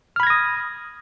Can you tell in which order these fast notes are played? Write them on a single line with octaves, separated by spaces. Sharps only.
F6 B5 G#6 A#6 D#6